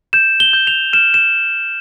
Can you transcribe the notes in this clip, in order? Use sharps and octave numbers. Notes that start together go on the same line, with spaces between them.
G6 E7
G7
G6
F7
F6 E7
E7